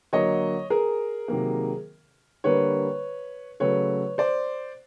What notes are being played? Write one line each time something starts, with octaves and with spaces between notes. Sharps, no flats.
D3 F#3 A#3 C#5 D#5
G#4 A#4
C3 D#3 F#3 A#3
D3 G3 A#3 B4 C#5
C#3 F#3 A3 B4 C#5
C5 D5